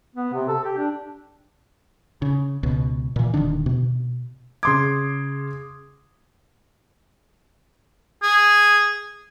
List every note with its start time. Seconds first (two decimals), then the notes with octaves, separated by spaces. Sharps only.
0.16 B3
0.33 C3
0.48 A4
0.64 G4
0.77 D4
2.22 C#3
2.63 C#2 B2
3.16 A#2 E3
3.34 D#1 D3 D#3 D4
3.66 B2
4.63 C#3 C6 D6 D#6 G#6
8.23 G#4